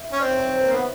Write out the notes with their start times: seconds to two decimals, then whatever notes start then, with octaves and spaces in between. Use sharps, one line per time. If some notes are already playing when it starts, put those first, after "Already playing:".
Already playing: E5
0.12 C#4
0.20 C4 D5
0.28 C#5
0.36 C5
0.44 C#5
0.54 C5
0.61 B4
0.66 A#3
0.69 C5
0.73 B3